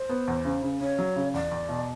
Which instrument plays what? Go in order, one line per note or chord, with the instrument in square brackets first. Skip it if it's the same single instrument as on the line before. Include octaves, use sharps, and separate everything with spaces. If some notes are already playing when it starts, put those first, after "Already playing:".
Already playing: [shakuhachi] C5
[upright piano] B3
E2
C#3
C#3
[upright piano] C#3 [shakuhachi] C#5
[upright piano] F#3
C#3
[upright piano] E2 [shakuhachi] D5
[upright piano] E2
B2